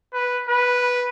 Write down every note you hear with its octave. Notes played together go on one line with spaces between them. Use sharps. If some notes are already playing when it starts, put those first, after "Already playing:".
B4
B4